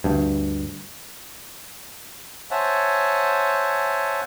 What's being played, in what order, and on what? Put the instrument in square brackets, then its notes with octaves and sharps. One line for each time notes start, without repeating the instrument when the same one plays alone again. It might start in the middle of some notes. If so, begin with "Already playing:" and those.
[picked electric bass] D2 G2
[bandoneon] C5 C#5 E5 F#5 G#5 A5